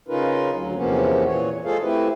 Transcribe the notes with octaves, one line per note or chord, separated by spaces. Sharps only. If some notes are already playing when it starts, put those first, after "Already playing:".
C#3 C#4 D#4 F4 A#4 B4
D2 F#3
E2 C3 F3 A#3 B3 C#4
A#2 E3 C#5
G#3 F4 G#4 A4 C5 F5
A3 C4 E4 G4 B4